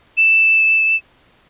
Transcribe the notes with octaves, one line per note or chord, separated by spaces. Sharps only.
E7